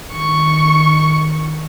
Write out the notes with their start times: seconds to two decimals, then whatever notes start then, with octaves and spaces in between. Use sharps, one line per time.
0.12 D#3 C#6